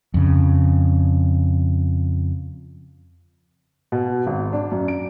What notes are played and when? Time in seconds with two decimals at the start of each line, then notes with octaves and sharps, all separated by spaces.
0.14 F2 C#3
3.92 B2
4.27 G#1
4.53 D4
4.71 F#2
4.88 D7